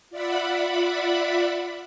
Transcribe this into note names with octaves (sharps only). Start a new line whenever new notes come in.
F4 D5 E5 F#5 B5